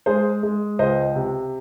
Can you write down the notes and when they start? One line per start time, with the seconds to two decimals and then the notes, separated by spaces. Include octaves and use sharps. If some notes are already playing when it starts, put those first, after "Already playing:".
0.06 G#3 G#4 C5
0.43 G#3
0.79 C#2 C5 D#5
1.15 C3